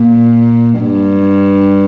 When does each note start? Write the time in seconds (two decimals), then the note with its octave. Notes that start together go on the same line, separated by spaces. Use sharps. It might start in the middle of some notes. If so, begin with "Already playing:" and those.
Already playing: A#2
0.81 G2